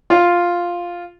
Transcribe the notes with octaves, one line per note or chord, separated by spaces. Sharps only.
F4